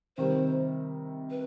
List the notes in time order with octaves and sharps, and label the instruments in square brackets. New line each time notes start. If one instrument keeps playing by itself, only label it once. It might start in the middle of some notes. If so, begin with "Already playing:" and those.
[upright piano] C3 D#3 G3 [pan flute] C5
[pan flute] B4